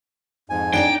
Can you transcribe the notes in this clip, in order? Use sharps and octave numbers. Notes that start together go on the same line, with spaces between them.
F2 G#2 G#5
D4 D#4 D5 G5